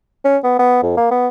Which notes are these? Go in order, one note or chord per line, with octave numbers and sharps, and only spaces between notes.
C#4
B3
B3
F2
A#3
B3